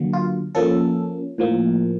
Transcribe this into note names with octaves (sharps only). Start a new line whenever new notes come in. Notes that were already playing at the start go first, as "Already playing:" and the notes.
Already playing: D3 F#3 A#3
F4
F3 A#3 C#4 A4
A2 F3 A#3